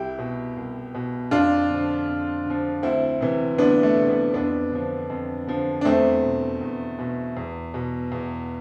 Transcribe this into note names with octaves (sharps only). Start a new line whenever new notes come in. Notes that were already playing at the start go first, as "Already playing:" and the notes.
Already playing: C2 E4 G4
B2
C2
B2
F2 D4 F4
D3 F3
F2
D3 F3
D2 C4 E4
C3 E3
D2 B3 D4
A3
C3 E3
B3
F2 B3 D4
D3 F3
F2
D3 F3
D4
E2 A3 C4
B2
E2
B2
E2
B2
E2